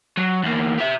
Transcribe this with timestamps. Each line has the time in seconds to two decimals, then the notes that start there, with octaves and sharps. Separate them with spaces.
0.17 F#3
0.43 E2 A#3
0.78 G4 E5